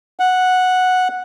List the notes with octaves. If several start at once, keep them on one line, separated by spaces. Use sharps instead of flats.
F#5